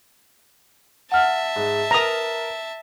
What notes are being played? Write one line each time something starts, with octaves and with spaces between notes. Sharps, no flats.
E5 F#5 A5 F6
G#2 G#3
A#4 B4 A#5 D#6